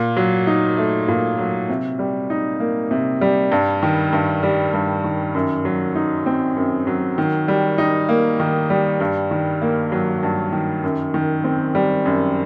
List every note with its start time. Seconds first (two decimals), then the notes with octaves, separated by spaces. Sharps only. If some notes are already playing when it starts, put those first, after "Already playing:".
Already playing: A#2
0.17 F#3
0.47 D#4
0.77 A3
1.08 A#2
1.38 F#3
1.69 C3
1.99 G3
2.30 D#4
2.60 A#3
2.91 C3
3.21 G3
3.52 G2
3.83 D#3
4.13 G2
4.43 G3
4.73 G2
5.04 D#3
5.35 F#2
5.65 F#3
5.95 D#4
6.26 C4
6.56 F#2
6.87 F#3
7.18 D#3
7.48 G3
7.78 D#4
8.09 A#3
8.40 D#3
8.70 G3
9.00 G2
9.31 D#3
9.62 A#3
9.92 F#3
10.23 G2
10.53 D#3
10.84 F#2
11.14 D#3
11.44 C4
11.75 G3
12.06 F#2